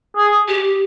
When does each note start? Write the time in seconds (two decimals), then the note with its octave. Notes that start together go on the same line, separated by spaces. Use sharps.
0.17 G#4
0.48 G4